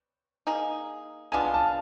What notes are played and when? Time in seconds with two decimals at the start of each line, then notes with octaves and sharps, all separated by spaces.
0.47 A#3 D#4 G#4
1.32 G#3 B3 D4 F4 G#5
1.54 A5